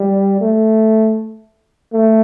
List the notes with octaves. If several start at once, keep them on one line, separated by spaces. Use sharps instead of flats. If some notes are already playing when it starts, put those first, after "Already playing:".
Already playing: G3
A3
A3